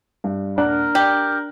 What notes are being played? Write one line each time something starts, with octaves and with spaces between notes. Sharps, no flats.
G2
D#1 D4 A#4 F#5 F#6
G4 D5 F#7